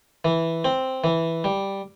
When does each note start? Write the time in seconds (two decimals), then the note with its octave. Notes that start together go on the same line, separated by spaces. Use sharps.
0.25 E3
0.65 C4
1.04 E3
1.44 G3